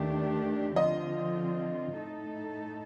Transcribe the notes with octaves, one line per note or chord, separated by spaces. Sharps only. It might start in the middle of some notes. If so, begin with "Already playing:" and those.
Already playing: D#2 D#3 A3 D4 G4
D3 F3 C4 F4 D#5
A2 A3 D#4 A4